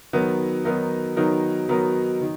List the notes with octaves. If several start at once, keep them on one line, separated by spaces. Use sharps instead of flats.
D#3 F#3 B3 D#4 A#4
D#3 F#3 B3 D#4 A#4
D#3 F#3 B3 D#4 A#4
D#3 F#3 B3 D#4 A#4
D#3